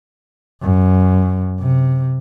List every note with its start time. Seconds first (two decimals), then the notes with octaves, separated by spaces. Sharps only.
0.62 F#2
1.60 C3